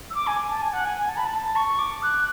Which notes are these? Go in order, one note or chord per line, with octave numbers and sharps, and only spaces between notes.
E6
D6
G#5
A5
G#5
F#5
G#5
G#5
A5
B5
A5
C#6
D6
F#6